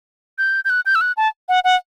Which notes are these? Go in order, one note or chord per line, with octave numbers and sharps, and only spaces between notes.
G6
G6
F#6
G6
E6
F#6
A5
F#5
F#5